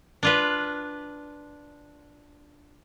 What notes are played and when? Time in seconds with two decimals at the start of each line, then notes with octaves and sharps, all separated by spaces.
0.23 D4 F4 B4